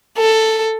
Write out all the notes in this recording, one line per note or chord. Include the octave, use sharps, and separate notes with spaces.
A4